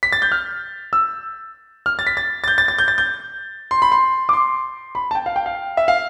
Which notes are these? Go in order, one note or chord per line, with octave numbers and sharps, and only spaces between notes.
B6
A6
G6
F6
E6
F6
A6
B6
A6
A6
G6
A6
A6
G6
A6
G6
C6
B5
C6
D6
C6
B5
A5
G5
F5
G5
F5
E5
F5